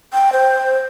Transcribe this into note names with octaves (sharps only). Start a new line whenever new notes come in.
G5
C5